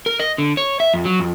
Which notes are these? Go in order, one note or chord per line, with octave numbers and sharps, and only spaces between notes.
A#4
D#5
D3
C#5
E5
F2
F#3
F2